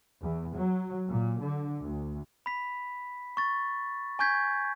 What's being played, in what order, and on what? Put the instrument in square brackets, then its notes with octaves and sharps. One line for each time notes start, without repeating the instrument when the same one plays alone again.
[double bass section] E2
F#3
A#2
D3
D2
[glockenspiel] B5 B6
C#6 A6
G#5 C#6 G6 G#6 B6